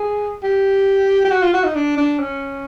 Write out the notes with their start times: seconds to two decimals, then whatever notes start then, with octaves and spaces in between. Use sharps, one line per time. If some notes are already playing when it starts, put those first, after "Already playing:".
Already playing: G#4
0.43 G4
1.25 G4
1.31 F#4
1.42 F4
1.53 F#4
1.64 D#4
1.75 D4
1.97 D4
2.19 C#4